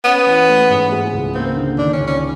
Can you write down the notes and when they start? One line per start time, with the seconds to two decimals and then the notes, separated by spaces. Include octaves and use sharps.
0.04 B3 C#4
0.26 E3
0.48 A3
0.70 G#2
0.92 G#3
1.13 C#2
1.35 A#3 C4
1.57 D3
1.78 D#3 D4
1.93 C#4
2.00 C#2
2.07 C#4